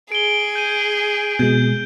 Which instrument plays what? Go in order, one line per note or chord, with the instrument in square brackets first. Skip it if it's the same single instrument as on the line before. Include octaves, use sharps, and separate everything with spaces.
[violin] G#4 [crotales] D7 G7
[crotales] G6 D7 D#7
[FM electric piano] B2 G#3 [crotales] G6